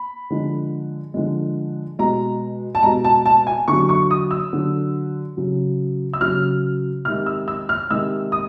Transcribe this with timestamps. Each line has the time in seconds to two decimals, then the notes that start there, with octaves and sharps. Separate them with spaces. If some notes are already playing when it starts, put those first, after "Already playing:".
Already playing: B5
0.30 D3 F3 G#3
1.14 D3 F3 G#3
1.99 B2 G#3 A#5
2.75 A5
2.83 B2 G#3 A#5
3.04 A5
3.26 A5
3.47 G#5
3.68 D3 F#3 C#6
3.89 C#6
4.11 D#6
4.31 E6
4.53 D3 F#3
5.37 C#3 F#3
6.13 E6
6.21 C#3 F#3 F6
7.05 C3 D#3 G#3 F6
7.26 E6
7.48 E6
7.69 F6
7.90 C3 D#3 G#3 E6
8.32 D#6